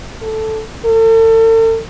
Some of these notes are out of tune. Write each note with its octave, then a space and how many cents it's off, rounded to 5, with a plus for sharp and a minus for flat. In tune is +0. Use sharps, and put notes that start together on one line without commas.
A4 -5
A4 +40